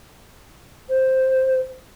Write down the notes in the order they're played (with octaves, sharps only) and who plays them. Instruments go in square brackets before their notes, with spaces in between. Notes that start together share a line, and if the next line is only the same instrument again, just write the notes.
[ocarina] C5